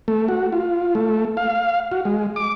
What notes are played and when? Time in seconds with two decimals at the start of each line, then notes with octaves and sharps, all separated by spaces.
0.08 A3
0.28 F#4
0.52 F4
0.95 A3
1.37 F5
1.92 F#4
2.05 G#3
2.36 D6